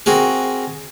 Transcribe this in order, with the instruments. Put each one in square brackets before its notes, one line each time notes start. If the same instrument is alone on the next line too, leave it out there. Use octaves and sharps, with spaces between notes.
[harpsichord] C4 F#4 G#4 A#4